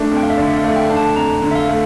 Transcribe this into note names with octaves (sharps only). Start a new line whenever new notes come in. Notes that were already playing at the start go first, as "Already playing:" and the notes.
Already playing: A3 D4
F2
G5
F5
E5
D3 D5
E5
F5
A3
G5
D4
A5
F2 A#5
D3
E5
F5
A3